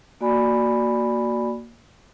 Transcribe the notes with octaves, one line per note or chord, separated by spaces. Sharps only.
A#3 F#4 D5 G#5 B5